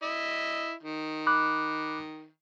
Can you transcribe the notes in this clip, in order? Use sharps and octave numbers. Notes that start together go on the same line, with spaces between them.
E4 D#5
D#3
B5 D6 F#6